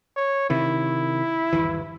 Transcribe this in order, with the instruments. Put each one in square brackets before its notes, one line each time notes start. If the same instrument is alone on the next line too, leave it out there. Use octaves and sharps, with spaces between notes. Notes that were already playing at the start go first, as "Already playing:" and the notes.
[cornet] C#5
[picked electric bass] C3 D#3 [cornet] E4
[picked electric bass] G1 D#2 E3